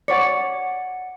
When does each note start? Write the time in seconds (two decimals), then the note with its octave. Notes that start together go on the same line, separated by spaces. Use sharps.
0.08 C#5 D5 F#5 C#7